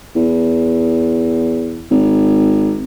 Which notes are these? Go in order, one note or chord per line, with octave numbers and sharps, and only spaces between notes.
E2
G#1